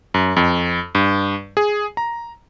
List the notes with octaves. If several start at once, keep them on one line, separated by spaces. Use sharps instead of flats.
F#2
F2
G2
G#4
A#5